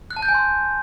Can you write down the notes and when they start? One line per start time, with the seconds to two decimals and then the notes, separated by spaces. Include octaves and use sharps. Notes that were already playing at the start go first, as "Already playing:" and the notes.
0.11 F#6
0.16 A5
0.22 G6
0.28 G#5
0.34 C6